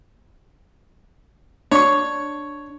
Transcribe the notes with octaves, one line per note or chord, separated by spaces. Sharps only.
D4 C#5 C#6